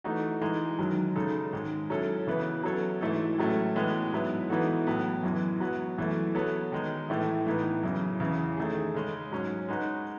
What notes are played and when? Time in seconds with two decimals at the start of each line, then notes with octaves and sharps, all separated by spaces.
0.04 E3 A3 D#4 F#4
0.41 E3 G#3 D#4
0.79 F#2 D#3 F#3
1.15 C#3 G#3 D#4 A4
1.53 G#2 D#3 G#3
1.90 F#3 C#4 E4 A4
2.27 C#3 E3 B3 E4 B4
2.63 F#3 C#4 F#4 A4 C#5
3.01 G#2 E3 A3 E4 A4
3.38 A2 F#3 A3 C#4
3.76 A2 E3 G#3 B3
4.12 G#2 F#3 B3 E4
4.50 E3 B3 D#4 F#4 A4
4.87 A2 F#3 B3
5.24 F#2 E3 G#3
5.60 F#3 B3 F#4
5.98 F#2 E3 A3
6.35 F#3 B3 F#4 A4 C#5
6.72 D#3 G#3 D#4
7.09 A2 E3 A3 E4
7.47 A2 E3 B3 D#4
7.83 F#2 C#3 E3
8.20 E2 C#3 E3
8.57 D#3 A3 D#4 G#4
8.94 C#3 G#3 C#4
9.31 G#2 F#3 C#4
9.69 G#3 D#4 F#4 B4